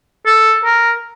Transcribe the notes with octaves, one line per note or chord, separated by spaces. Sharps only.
A4
A#4